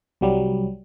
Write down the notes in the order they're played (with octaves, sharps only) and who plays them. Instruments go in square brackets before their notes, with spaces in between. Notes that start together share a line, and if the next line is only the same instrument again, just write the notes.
[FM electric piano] C2 F#3 G3